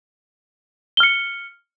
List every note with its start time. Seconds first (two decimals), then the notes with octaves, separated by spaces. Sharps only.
0.97 G7
1.00 F6
1.03 C#7